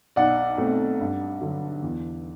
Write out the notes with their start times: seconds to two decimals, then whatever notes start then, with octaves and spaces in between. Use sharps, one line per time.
0.16 B1 D5 F#5
0.58 B2 A3 C4
1.00 G2
1.40 D3 F#3
1.82 E2